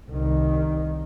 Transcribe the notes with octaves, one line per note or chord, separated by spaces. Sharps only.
C2 D#3